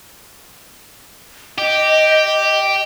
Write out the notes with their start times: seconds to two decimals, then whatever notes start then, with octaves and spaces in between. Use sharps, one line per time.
1.58 G4 D#5